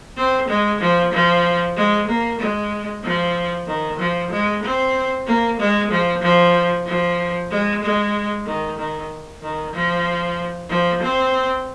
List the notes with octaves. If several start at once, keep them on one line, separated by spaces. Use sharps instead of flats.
C4
G#3
F3
F3
G#3
A#3
G#3
F3
D#3
F3
G#3
C4
A#3
G#3
F3
F3
F3
G#3
G#3
D#3
D#3
D#3
F3
F3
C4